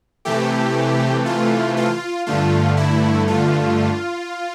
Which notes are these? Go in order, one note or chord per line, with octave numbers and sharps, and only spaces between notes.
C3 E3 A3 G4
F4
F4
G2 D3 A3 F4
E4
F4